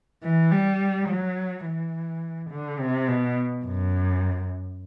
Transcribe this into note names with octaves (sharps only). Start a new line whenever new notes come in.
E3
G3
F#3
E3
D3
C3
B2
F#2